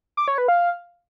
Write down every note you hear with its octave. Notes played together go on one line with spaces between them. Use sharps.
D6
C#5
B4
F5